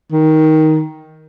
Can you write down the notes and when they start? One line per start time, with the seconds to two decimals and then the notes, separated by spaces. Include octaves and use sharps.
0.12 D#3